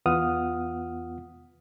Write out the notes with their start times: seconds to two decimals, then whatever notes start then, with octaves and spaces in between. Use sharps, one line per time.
0.06 E2 B3 F4 F#5 D#6 F6